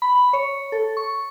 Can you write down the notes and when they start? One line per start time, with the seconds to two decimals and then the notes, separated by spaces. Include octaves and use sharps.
0.02 B5
0.33 C#5
0.72 A4
0.97 C#6